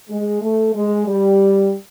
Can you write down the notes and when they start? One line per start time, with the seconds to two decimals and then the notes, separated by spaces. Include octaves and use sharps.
0.09 G#3
0.41 A3
0.74 G#3
1.05 G3